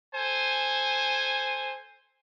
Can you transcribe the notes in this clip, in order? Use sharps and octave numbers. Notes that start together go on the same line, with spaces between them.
A4 C5 G#5